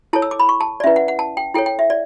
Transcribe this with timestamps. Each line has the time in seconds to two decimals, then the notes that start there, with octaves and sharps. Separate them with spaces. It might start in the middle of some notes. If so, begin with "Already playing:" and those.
0.13 E4 A4 C#5 A5
0.22 E6
0.31 D6
0.39 B5
0.49 C#6
0.61 A5
0.80 D5
0.84 C#4 E4 B4 E5
0.96 F#5
1.08 F#5
1.19 A5
1.37 G5
1.54 E4 A4 C#5 G5
1.66 G5
1.79 E5
1.90 D5